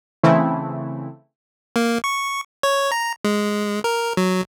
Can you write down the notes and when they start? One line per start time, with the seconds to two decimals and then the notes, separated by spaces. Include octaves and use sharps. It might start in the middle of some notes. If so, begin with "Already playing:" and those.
0.23 C#3 E3 A3 C4 E4
1.76 A#3
2.04 C#6
2.63 C#5
2.92 A#5
3.24 G#3
3.84 A#4
4.17 F#3